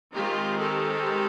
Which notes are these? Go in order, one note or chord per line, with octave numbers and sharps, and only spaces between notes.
D#3 G#3 C4 F4 G4
G4 A4